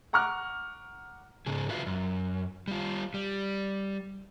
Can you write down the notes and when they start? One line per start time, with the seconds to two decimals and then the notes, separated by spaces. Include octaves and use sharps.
0.13 F#5 A#5 C#6 D6 F6 F#6
1.47 G#2 C#3 G#4
1.69 F4 F#4 B4 E5 F5
1.87 F#2
2.68 G3 F4
3.14 G3